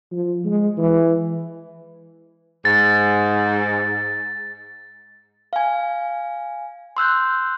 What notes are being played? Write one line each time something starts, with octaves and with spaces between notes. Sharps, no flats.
F3
G#3
E3
G#2 A6
F5 G#5
C6 E6 F#6 G6